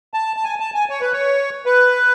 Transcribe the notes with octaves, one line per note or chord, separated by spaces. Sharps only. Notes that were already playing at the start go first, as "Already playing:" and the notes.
A5
A5
G#5
A5
G#5
C#5
B4
C#5
B4